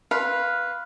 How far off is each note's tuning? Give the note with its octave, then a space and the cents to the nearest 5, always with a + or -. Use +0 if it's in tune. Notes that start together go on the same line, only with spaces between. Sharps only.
B4 -5 F5 +0 C6 +20